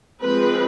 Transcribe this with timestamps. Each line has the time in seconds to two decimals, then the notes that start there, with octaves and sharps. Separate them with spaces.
0.21 F3 G#3 C4 B4